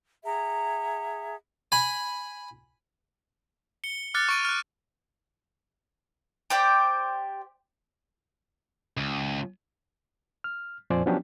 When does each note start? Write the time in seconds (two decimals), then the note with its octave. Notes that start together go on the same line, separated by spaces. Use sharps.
0.23 G#4 E5 F#5 A#5
1.72 G#5 B5
3.84 C#7 G7
4.14 D6 F6 F#6 A6 C#7
4.29 C#6 D7 D#7
4.45 F6 F#6
6.50 G4 C5 D5 G5
8.97 C#2
10.44 F6
10.90 F2 A#2 F3 C5 D5 G#5
11.06 F3 F#3 B3 C#4 D4 G4